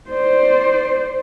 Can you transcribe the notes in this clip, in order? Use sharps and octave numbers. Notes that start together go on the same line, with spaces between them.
C5 D5